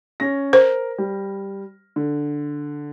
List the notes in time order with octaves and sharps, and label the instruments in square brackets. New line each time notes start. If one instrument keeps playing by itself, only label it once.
[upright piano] C#4 A#6
[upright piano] A#4 [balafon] C5
[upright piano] G3
D3